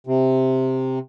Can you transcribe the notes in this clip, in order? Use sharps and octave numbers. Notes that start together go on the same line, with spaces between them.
C3